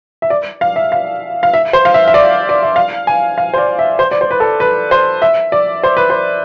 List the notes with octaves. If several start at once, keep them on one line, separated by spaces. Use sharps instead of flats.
E5
D5
F5
E5
F5
F5
E5
C5
F5
E5
E5
D5
D5
E5
F5
G#5
F5
C5
D5
E5
C5
D5
C5
B4
A4
B4
C5
E5
D5
C5
B4
C5